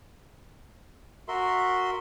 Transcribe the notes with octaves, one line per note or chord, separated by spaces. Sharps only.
F#4 A#4 E5 C6